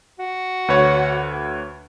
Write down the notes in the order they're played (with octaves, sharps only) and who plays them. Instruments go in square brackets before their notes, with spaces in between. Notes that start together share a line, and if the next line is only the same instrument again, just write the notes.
[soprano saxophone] F#4
[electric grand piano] D2 B4 C#5